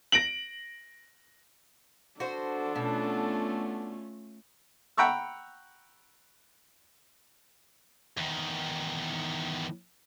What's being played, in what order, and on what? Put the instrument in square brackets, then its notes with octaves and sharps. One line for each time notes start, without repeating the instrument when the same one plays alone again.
[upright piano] A#6 D7 F#7
[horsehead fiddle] D4 A4 [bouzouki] F#4 C5
[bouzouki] B2 [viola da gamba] A3 C#4 F4
[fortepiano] F#5 G5 A#5 B5 C#6 E6
[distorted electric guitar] E2 D#3